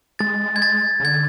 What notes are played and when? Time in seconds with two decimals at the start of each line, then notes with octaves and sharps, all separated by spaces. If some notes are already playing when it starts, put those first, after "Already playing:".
0.19 G#3 A6
0.56 G#6
0.62 A6
1.00 C#3
1.04 D3 G#6